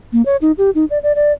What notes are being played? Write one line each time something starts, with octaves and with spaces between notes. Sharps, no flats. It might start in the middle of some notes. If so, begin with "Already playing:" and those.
A#3
C#5
D#4
G4
D#4
D5
D5
D5